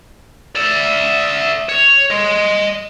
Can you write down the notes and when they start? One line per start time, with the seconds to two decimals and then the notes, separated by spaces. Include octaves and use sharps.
0.56 D5 E5
1.69 C#5
2.11 D#5 C6